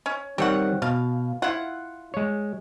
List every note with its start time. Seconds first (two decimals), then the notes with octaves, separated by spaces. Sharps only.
0.06 C#4
0.38 D#3 G3 C4 C#5 F#5
0.82 B2 F5
1.42 E4 F4 F#5
2.14 G#3 C#5